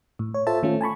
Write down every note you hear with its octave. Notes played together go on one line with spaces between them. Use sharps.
A2
C#5
F4 A4 C5 E5 A5
D#3 A3 C#4 F4
G#5 A5 B5 C#6